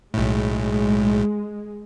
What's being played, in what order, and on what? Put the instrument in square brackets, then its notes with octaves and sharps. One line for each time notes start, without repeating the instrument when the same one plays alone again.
[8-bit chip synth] B1 A2 [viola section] G#3